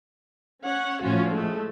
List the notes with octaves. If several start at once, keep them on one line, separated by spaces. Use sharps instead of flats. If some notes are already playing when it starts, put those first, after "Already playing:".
C#4 C#5 F#5
A2 F3 C#4 F4 F#4
G#3 A3